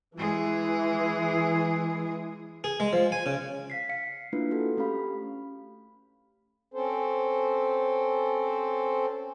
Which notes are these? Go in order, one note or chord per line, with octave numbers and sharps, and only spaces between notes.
E3 G#3 G#4
G#4
G#3
F3
G#5
C#3
F5 B6 C7
F5 C7 C#7
A3 A#3 D4 E4 F4 B4
F#4 A4
A3 C#4 G4 F5 B5
C4 C#4 A4 C5